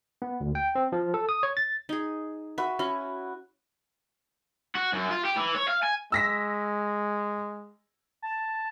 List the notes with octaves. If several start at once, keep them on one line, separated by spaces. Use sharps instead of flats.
B3
D2
G5
C4
F3
A4
D#6
C#5
A6
D#4 G#4
F#4 B4 E5
C#4 E4 F#4
F#4
F#2
F4
G4
E3
C#5
F5
G#5
G#3 E6 A#6 B6
A5